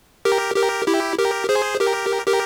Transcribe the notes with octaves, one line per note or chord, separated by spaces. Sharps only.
G4 A#4
G4 A#4
E4 G4
G4 A#4
G#4 C5
G4 A#4
G4 A#4